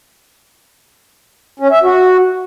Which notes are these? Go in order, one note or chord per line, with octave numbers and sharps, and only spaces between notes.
C#4
E5
F#4